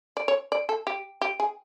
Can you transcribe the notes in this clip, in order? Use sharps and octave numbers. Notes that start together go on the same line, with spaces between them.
D5
C#5
D5
A4
G4
G4
G#4